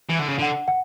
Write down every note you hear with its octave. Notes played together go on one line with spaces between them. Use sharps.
E3
D3
C#3
D3 F#5
F#5